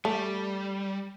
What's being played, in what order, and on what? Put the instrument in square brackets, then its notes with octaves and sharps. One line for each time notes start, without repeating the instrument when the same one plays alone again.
[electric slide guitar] G3 [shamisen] A3